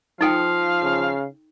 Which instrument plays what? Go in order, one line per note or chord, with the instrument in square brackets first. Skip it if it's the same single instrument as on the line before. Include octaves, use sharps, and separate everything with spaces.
[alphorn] F3 [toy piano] D#4 A4 G5 [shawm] F5
[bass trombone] C#3